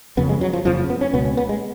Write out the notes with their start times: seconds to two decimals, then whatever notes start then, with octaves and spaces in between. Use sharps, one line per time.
0.17 F#1 F2 C#3 B3
0.29 G#3
0.41 F#3
0.53 F3
0.65 F#1 F2 C#3 F3
0.90 B3
1.01 C#4
1.14 C#2 B2 B3
1.25 C#4
1.37 B3
1.49 G#3